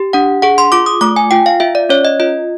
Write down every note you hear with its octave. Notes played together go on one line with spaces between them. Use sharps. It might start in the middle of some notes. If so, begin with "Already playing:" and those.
Already playing: G4
D4 F#5
G#4 F#5
C6
F4 D6
D#6
A3 D6
G#5
F4 G5
F5
F4 E5
D5
C#4 C#5
D#5
F4 D#5